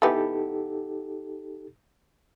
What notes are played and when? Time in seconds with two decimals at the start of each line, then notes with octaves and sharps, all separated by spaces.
0.02 E3 B3 D#4 G4 A4